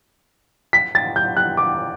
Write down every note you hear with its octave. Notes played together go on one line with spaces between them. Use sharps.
B6
A6
G6
F#6
D6